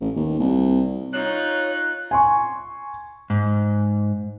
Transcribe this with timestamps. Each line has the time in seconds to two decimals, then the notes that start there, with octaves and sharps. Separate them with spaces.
0.01 A1
0.16 D#2
0.40 C2
1.13 D#4 F4 C#5 F#6
2.11 G#5 C6 C#6
3.30 G#2